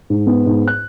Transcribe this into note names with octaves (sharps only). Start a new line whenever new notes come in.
G#2
B3
G#2
F#6